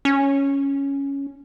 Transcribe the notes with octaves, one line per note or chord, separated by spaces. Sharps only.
C#4